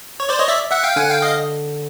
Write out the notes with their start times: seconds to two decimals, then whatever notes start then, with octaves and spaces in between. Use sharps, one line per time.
0.20 C#5
0.29 C5 D5
0.39 C#5 D#5
0.48 D5 E5
0.71 E5 F#5
0.84 F5 G5
0.96 D3 F#5 G#5
1.09 F5 G5
1.22 D#5 F5